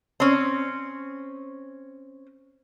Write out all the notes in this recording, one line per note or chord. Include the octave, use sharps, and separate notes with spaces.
C4 C#4